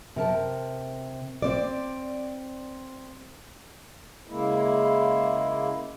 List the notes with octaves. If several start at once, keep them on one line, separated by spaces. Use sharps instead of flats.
C3 A#4 A5
C4 D5
C#3 G#3 A#3 E4